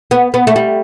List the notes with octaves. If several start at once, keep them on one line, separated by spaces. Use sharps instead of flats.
B3
B3
A3
G3